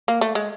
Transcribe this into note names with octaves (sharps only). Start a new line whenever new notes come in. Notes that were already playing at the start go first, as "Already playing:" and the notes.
A#3
A3
G#3